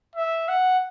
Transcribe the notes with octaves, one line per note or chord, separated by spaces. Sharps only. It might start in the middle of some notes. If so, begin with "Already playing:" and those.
E5
F#5